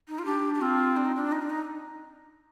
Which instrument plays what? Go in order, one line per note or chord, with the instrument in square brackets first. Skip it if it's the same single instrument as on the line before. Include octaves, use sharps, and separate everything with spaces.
[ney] D#4
F4
[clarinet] D4 [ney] G4
[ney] G4
[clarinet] C4 [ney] F4
[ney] D4
D#4
D4
D#4
D4
D#4